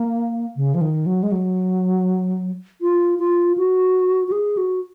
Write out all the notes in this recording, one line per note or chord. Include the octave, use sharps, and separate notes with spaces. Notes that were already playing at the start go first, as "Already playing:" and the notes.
Already playing: A#3
C#3
F3
D#3
F#3
G#3
F#3
F4
F4
F#4
F#4
G#4
F#4